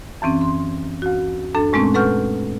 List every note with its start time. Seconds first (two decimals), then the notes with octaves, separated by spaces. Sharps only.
0.22 F#2 E3 C4 C#4
0.41 C6
1.02 D2 F#4
1.55 F#2 D4 A4
1.73 A#2 G#3 A3 C4 C#4
1.94 A4 B4 F#5 C#6 F6 G6